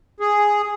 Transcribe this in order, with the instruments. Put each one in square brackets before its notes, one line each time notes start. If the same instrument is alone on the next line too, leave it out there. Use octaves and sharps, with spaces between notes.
[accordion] G#4